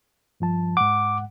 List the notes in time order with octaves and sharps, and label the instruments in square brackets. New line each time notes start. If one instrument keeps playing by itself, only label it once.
[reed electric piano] G2 F3 A5
[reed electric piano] G#2 F#5 [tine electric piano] D6